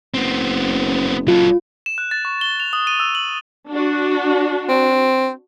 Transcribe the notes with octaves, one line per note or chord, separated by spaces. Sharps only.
F#1 B3 C4
F#3 F4 A4
E7
F#6
A6
C#6
G7
F7
D#6
D#7
E6
F#7
D4 F#4
C4